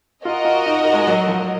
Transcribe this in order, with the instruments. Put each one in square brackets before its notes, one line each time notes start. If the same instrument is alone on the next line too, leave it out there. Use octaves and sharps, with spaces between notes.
[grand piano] F4 [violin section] F#4 A#4 D#5
[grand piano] F4
D#4
D#4
G#3
F#3
F3